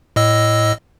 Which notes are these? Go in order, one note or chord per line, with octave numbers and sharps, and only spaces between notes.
A2 D#5 E6